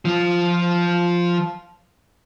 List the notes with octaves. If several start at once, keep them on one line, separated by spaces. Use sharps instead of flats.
F3 F4